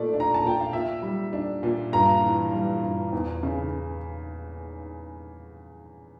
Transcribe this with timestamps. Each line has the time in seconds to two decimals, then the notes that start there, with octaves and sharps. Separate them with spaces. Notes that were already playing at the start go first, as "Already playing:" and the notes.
Already playing: A#2 A3 D5
0.14 D4
0.20 A#5
0.34 A5
0.44 A#2 G5
0.60 F5
0.73 A#2 E5
1.03 G3
1.33 D4
1.63 A#2
1.92 G2 A#5
2.23 E3
2.53 G3
2.83 G2
3.13 E2
3.43 C#3